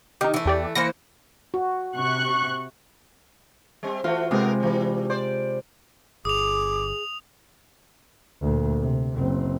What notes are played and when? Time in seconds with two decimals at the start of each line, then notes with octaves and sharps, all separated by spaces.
0.21 D#3 D#4 G4
0.34 E3 A3
0.46 E2 G4 D5
0.75 E3 A#3 C5 A#6 C#7
1.54 F#4
1.97 C3 C#6 F#6
3.83 G3 C4
4.04 E3 A3 F4 F#4
4.31 C3 G#3 B3 C4 A#4
4.60 E3 G3
5.10 C5 D5
6.25 G1 G#4 D6 D#6 F7
8.42 D2 A#2
8.80 C3
9.16 F#1 C4